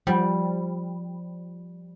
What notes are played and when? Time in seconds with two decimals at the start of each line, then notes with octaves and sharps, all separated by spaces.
0.07 F3 G3